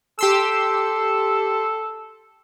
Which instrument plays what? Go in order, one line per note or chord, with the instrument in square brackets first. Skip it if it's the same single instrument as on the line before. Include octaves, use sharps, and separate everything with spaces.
[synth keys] G4 C6 E6 [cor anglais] A4